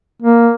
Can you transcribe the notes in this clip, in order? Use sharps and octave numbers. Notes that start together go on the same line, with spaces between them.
A#3